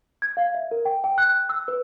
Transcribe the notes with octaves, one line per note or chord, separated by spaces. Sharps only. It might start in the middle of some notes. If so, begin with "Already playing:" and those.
G#6
F5
E5
A#4
G5
G5
F#6
E6
B4